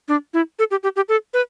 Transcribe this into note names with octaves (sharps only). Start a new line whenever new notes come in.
D4
E4
A4
G4
G4
G4
A4
B4